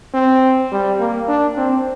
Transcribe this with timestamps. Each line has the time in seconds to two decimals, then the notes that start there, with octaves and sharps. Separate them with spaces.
0.14 C4
0.72 G3
1.00 A#3
1.28 D4
1.57 C4